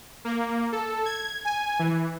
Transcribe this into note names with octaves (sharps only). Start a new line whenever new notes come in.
A#3
A4
G#6
G#5
E3